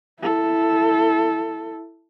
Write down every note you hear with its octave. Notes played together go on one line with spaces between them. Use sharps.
E4 A4